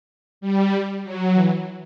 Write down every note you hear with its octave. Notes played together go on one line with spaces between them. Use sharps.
G3
F#3
E3